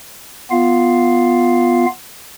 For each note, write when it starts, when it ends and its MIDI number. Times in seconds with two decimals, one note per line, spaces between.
0.51 1.86 59
0.51 1.86 65
0.51 1.86 77